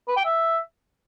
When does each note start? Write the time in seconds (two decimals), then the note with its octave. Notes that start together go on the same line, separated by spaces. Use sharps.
0.08 B4
0.17 G5
0.25 E5